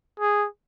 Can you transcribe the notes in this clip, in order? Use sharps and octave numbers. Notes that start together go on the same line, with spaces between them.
G#4